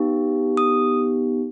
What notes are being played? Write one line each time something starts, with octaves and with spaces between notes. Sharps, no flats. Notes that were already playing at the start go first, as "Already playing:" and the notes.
Already playing: B3 D#4 G4
D#6